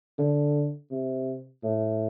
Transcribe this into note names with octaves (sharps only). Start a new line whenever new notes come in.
D3
C3
A2